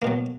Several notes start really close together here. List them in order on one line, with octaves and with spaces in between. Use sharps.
A#3 B2 F#3